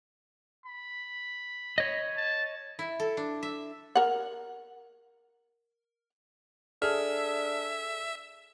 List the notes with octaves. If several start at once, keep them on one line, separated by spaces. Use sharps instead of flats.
B5
C#5 D#5
A5
E4
A4
D4
E5
A#4 F#5
D4 G#4 A4 E5 F6